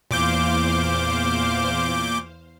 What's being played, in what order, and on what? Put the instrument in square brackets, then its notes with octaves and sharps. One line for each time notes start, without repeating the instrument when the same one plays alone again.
[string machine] E2 C5 F5 [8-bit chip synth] A#2 D6 G6